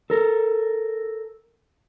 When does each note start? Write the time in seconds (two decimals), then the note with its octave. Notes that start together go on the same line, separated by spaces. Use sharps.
0.10 A4 A#4